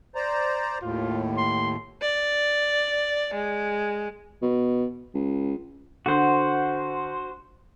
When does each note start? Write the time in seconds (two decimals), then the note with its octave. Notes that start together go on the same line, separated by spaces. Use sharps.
0.15 C5 D5 A#5
0.82 D#2 A2 F4
1.37 C6
2.02 D5
3.34 G#3
4.42 B2
5.14 C#2
6.06 D3 F#4 C5